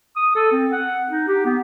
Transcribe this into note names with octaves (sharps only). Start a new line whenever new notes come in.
D#6
A4
C4
F#5
D#4
G4
B3